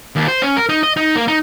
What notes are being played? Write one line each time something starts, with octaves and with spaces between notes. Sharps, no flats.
D#2
C5
C#4
A#4
D#4
D#5
D#4
A#3
D#4